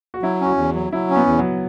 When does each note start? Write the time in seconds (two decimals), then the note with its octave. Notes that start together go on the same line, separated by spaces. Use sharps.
0.14 F#4
0.22 F#3 E4
0.41 C#4 F#4
0.57 E2
0.75 F#3
0.92 F#3 E4
1.10 C#4
1.16 B3
1.27 E2
1.39 F#3